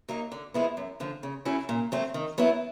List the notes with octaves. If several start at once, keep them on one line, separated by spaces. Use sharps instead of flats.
F#3 A#3 D#4
D3
F3 G#3 B3 E4
F#2
D3 F3
C#3
F#3 A3 C#4 E4
A#2
F#3 A3 C4
D#3
F#3 B3 E4